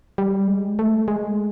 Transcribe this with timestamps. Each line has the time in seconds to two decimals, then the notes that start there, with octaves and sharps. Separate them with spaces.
0.18 G3
0.48 G#3
0.79 A3
1.08 G#3